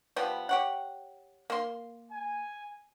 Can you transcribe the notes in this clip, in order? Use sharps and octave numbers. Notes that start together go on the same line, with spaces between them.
F3 G3 B3
G4 C#5 F#5
A#3 C6
G#5